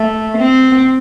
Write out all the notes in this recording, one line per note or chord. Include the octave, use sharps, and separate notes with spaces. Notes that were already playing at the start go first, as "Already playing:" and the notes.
Already playing: A3
C4